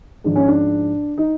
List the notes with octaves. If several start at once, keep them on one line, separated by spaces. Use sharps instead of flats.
G#2 F3 D4
C#4
D4
D#4